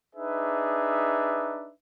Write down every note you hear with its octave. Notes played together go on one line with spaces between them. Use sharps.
D4 D#4 G#4 B4 E5